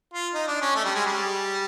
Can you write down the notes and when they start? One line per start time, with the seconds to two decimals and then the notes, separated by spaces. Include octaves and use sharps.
0.13 F4
0.34 D#4
0.48 D4
0.61 C#4
0.76 A3
0.85 G3
0.95 G#3
1.06 G3